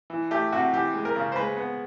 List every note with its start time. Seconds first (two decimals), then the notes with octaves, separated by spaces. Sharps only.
0.10 E3
0.31 A3 G4
0.53 C3 F#4
0.73 E3 G4
0.94 G#3
1.05 A#4
1.16 C#3
1.32 C5
1.36 G#3 B4
1.57 B3